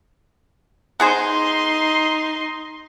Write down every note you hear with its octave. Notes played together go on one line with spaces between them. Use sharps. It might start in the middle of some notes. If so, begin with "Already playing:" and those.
B3 D#4 G#4 C5 C6